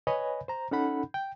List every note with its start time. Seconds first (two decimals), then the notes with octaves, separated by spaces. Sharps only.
0.07 B4 C#5 D#5 G#5 B5
0.48 C5 A#5
0.71 C#4 D#4 A4 F#5 B5
1.14 G5